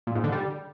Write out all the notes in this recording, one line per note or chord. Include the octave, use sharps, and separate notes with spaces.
A#2
G#2
D3
G3